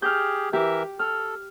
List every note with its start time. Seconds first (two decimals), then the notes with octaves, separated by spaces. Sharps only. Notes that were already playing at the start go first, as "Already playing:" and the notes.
0.02 G4 G#4 F6 G6
0.53 E3 G4 A#4 E5
0.99 A4 F6